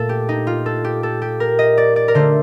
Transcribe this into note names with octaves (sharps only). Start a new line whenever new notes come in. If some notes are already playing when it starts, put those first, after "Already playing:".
Already playing: A#2 A3 A4
G4
D#4
F4
A4
G4
A4
G4
A#4
D#5
D5
D5
A#4
D3 A3 C5